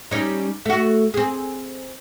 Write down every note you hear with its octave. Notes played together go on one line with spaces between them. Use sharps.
G3 C#4 D#4
A3 F#4
C4 G#4